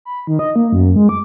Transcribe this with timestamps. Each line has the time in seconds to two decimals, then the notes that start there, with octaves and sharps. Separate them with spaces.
0.05 B5
0.27 D#3
0.39 D#5
0.56 A#3
0.72 F#2
0.96 G#3
1.09 D6